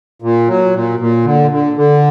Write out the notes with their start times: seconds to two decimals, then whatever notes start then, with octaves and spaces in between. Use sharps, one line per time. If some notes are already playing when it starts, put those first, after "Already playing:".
0.22 A#2
0.48 F#3
0.74 A#2
0.99 A#2
1.25 D3
1.51 D3
1.77 D3